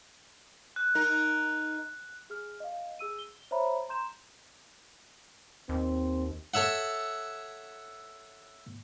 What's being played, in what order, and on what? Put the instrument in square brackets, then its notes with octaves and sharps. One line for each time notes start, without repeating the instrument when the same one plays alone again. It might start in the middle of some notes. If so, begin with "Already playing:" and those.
[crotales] F#6
[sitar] D#4 A#4
[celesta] G#4 F6
D#5 F5
G#4 E6 D#7
G7
C5 C#5 E5 A#5 B5
A#5 C6 G6 E7
[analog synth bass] D#2 [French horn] C4
[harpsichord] A4 C#5 E5 F#5